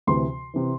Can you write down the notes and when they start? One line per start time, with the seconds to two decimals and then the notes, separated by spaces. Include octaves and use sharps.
0.07 D2 C3 E3 C6
0.54 C3 E3